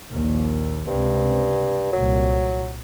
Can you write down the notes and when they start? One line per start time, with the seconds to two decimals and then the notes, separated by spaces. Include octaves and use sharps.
0.11 A#1 D#2 A#2
0.87 C#2 G2 C3 C4
1.93 C2 A#2 F#3